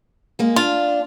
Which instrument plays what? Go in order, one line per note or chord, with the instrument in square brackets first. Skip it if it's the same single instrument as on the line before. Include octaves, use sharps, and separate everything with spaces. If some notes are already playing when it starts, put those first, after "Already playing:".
[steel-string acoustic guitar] G#3 A#3 G#4
[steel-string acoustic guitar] D4 [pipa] F4